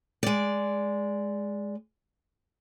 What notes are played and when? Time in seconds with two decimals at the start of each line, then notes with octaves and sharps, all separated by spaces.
0.23 G#3 D5